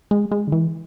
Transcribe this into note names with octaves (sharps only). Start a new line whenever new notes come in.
G#3
G#3
D3
E3